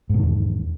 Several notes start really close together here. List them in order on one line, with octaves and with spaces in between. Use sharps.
G#2 B2 D#3 E2